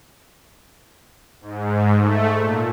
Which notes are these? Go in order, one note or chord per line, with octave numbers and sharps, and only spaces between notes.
G#2
A3
A#2